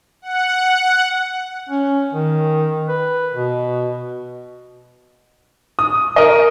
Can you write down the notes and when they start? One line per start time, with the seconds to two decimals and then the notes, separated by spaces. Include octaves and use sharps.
0.22 F#5
1.69 C#4
2.13 D#3
2.88 B4
3.33 B2
5.79 D#6
6.16 A#4 D#5